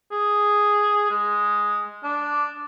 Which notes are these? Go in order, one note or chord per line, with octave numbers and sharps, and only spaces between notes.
G#4
G#3
D4